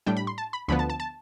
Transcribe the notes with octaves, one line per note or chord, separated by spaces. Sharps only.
A2 G3 D4 G5
B5
C6
A5
B5
D2 D3 F3 B3 B5
A5
A5
A5